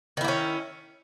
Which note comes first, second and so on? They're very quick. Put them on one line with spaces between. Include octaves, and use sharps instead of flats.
D#3 E4 A#3 C#4